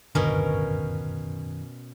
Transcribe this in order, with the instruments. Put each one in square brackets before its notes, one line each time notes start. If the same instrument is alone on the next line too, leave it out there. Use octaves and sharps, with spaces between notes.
[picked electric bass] D1 G1 D3 [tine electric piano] F#2 D#3 [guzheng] B2 C#4 A#4